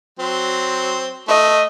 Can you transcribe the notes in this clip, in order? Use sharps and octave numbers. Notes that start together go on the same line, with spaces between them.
F#3 C4 C5
A3 D#5